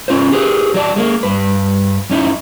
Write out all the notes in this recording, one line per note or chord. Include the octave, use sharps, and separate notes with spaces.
C#4 F4 B4 C5
G4 G#4 B4
F#3 D5 A5
G#3 A#3
G2 B4
F#2 C#4 D#4 E4